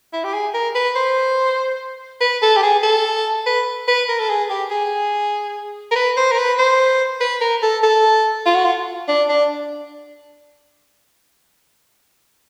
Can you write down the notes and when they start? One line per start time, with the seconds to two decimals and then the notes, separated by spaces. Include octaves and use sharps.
0.13 E4
0.24 G4
0.34 G#4
0.54 A#4
0.75 B4
0.96 C5
2.21 B4
2.42 A4
2.57 G4
2.63 G#4
2.83 A4
3.46 B4
3.88 B4
4.09 A#4
4.20 A4
4.29 G#4
4.50 G4
4.71 G#4
5.91 A#4
5.96 B4
6.17 C5
6.31 A#4
6.38 B4
6.59 C5
7.21 B4
7.41 A#4
7.62 A4
7.83 A4
8.46 F4
8.55 F#4
8.65 F4
9.08 D4
9.29 D4